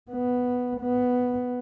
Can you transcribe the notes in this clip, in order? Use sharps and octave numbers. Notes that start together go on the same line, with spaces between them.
B3
B3